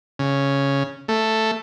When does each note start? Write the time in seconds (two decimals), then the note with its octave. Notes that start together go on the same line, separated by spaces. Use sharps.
0.19 C#3
1.08 A3